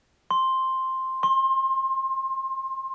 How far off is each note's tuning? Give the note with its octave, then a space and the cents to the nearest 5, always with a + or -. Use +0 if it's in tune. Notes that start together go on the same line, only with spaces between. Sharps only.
C6 +5
C6 +30